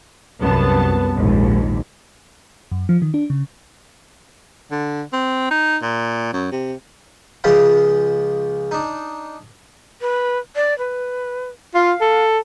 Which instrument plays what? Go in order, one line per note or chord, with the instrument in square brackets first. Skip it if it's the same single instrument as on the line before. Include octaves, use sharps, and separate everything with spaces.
[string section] C2 F#2 B3 A5
A#1 D#2 G#2
[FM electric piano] F#2
F3
D#3
D4
C#3
[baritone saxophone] D3
C4
D#4
A#2
F#2
C3
[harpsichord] C#2 F3 G#3 F4 C5 B5
D4 D#4
[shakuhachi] B4
D5
B4
[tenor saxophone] F4 [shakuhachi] F5
[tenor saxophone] A4